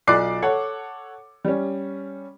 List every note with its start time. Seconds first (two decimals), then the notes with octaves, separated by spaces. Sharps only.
0.07 B1 F4 D5 D6 F#6 C7
0.42 A4 C#5 F#5
1.45 G3 C#4